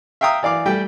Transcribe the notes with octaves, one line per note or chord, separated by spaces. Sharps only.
E5 F5 G5 A#5 D#6
E3 D5 F5 D6
G3 A3 G5